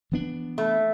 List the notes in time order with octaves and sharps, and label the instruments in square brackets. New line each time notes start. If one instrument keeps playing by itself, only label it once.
[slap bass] E3 B3 D4
[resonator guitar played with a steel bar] A3